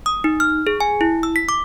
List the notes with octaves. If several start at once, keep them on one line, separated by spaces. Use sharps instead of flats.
D#6
D#4
F6
G#4
G#5
E4
E6
B6
D6